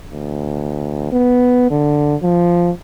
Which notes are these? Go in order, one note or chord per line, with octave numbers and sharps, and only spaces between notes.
D2
B3
D3
F3